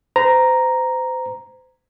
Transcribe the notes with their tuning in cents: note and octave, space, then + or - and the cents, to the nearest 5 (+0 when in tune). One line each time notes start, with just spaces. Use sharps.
C5 -35 A#5 +0